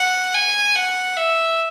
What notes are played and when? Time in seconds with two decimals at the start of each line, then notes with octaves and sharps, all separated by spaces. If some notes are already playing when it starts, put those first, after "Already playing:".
Already playing: F#5
0.34 G#5
0.75 F#5
1.17 E5